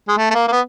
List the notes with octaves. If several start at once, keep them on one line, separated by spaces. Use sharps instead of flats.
G#3
A3
A3
A#3
A#3
B3